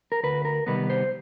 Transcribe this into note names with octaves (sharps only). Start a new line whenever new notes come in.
A#4
D2 B4
A#4
C3 D#3 G3 B3 B4
C5